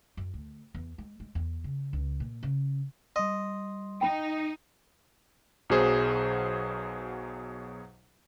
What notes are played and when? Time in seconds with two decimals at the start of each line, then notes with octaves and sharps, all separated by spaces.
0.17 F#2
0.34 D2
0.75 E2
0.98 G#3
1.20 G#3
1.35 E2
1.64 C#3
1.93 C#2
2.20 A#2
2.43 C#3
3.16 G3 D#5 C6
4.01 D#4 G5 B5
5.70 B1 B2 F#3 G#4 C5